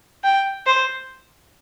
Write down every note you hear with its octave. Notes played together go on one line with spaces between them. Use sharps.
G5
C5